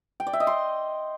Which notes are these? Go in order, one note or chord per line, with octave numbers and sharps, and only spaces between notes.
G5
D5
E5
D#5
C6